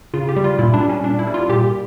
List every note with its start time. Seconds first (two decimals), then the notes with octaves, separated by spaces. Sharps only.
0.14 C#3 F4
0.29 G4
0.36 G3
0.44 F4
0.59 A#2 E4
0.74 D4
0.81 G3
0.89 C#4
1.04 A#2 D4
1.19 E4
1.27 G3
1.34 F4
1.49 A#2 G4